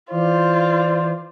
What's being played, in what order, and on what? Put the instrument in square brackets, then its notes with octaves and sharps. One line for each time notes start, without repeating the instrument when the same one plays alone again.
[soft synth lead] E3 [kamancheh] F4 [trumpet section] C5 D5